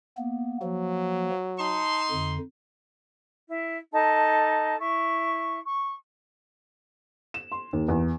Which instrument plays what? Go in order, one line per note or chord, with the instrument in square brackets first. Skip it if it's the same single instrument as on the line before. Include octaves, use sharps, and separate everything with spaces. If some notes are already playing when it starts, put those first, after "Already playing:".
[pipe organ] A#3 B3
[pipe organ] F3 A#3 [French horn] F#3
[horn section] D#4 C6 [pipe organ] A5
[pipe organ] F2 D3
[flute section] E4
D#4 A4 A5
E4 C#6
C#6
[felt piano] E7
C6
D#2
E2